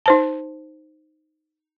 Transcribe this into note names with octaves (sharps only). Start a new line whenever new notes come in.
D#4 C5 A5